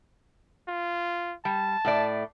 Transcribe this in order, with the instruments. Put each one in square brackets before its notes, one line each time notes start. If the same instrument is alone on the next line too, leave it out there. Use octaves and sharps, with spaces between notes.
[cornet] F4
[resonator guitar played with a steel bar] G3 [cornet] A5
[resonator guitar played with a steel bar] A2 A3 D5